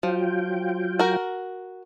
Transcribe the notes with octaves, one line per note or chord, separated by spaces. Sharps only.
F3 F#3 F4 G5
F#4 A#4